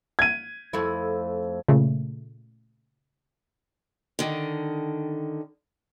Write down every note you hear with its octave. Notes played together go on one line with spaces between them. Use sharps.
G#6 D#7
F2 A3 E4
A#2 C#3 A3
D3 D#3